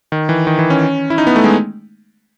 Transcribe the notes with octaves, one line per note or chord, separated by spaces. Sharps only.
D#3
E3
D#3
E3
C#4
E4
D#4
B3
A3
G#3